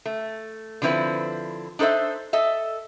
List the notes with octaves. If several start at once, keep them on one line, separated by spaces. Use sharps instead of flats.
A3
D3 F3 C4 E4 B4
D4 D#4 A4 C5 E5
A4 D#5 E5